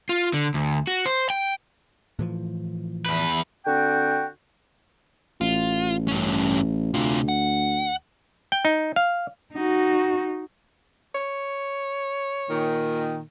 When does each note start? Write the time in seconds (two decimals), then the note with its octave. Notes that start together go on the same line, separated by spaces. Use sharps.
0.09 F4
0.34 D3
0.54 D2
0.87 F#4
1.06 C5
1.30 G5
2.19 A2 E3 F3
3.06 E2 B4
3.66 D3 C4 F#4 G5
5.41 A1 F4
6.08 G2 C#4
6.94 D2 C3 F4
7.29 F#5
8.52 G5
8.65 D#4
8.96 F5
9.54 D#4 F#4
11.15 C#5
12.50 A#2 D#3